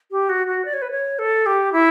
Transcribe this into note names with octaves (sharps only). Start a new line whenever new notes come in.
G4
F#4
F#4
D5
C#5
B4
C#5
A4
G4
E4